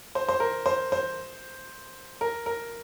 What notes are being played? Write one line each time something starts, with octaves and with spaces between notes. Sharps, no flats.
C5
C5
A#4
C5
C5
A#4
A#4